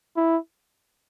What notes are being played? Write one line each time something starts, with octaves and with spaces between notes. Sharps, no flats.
E4